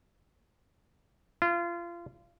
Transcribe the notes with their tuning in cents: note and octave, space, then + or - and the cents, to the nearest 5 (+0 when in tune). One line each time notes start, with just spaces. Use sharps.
F4 -25